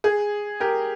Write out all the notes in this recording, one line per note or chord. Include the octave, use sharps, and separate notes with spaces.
G#4
G4 A#4